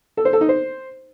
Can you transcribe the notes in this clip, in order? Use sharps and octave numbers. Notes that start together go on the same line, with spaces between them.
A4
C5
A4
D#4
C5